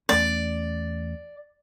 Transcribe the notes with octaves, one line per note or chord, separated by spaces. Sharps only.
E2 A3 C#4 D5